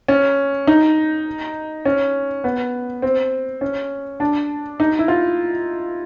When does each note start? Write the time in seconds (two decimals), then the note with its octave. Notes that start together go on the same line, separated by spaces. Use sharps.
0.08 C#4
0.67 D#4
1.85 C#4
2.44 B3
3.02 C4
3.61 C#4
4.20 D4
4.80 D#4
4.99 E4
5.08 F4